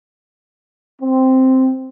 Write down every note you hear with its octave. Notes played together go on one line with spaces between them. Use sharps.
C4